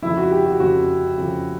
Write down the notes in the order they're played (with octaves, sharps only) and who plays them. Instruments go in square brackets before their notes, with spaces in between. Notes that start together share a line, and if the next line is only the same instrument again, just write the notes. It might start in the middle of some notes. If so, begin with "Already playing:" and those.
[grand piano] F2 C#3 F3 [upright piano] E4
[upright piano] F#4
G4
F#4
[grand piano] F2 C#3 F3 [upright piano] F#4
[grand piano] F2 C#3 F3